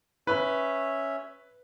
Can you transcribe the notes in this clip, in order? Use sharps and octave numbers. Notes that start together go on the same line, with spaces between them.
C#4 B4 C#5 E5